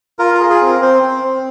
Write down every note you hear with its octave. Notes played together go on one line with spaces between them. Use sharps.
F4 A#4
A#4
G#4
G#4
C4
A#4
C4 C5
C4
C4